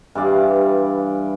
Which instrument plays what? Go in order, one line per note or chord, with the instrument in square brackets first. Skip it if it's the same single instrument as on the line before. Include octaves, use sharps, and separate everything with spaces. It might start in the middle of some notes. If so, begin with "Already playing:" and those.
[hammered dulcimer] G2 E3 D5 F5